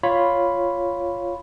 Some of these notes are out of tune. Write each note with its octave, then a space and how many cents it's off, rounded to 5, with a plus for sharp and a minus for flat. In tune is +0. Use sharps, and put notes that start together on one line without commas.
F4 +0 C#5 +0 B5 +0